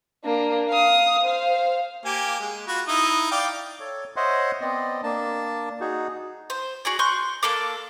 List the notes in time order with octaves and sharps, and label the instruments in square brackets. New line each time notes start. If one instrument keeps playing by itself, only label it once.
[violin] A#3 D4
F5 D#6
C5 F5
[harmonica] A#3 G4 G#5
G#3
F4 F#4 B5
D#4 E4 D#6
D5 F5 G5
[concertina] A4 C#5
C5 C#5 D#5 E5 F#5 C6
B3 C4 D5 D#5
A#3 D4 A5
D#4 F#4 G#4
[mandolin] C5
F#4 G#4 D5
C6 C#6 F#6 G6
A#3 D4 A4 D6